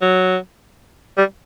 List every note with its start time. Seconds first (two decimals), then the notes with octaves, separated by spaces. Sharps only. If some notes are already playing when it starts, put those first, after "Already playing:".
0.02 F#3
1.17 G3